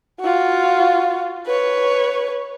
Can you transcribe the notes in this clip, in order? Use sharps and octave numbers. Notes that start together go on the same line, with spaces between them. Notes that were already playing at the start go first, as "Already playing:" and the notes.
F4 F#4
B4 C#5